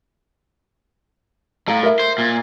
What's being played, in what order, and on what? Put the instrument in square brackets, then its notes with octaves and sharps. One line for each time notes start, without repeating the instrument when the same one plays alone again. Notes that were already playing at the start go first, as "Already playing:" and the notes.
[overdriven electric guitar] A2 [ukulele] F5 A#5
[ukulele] A#4 E5
[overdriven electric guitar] C5
A#2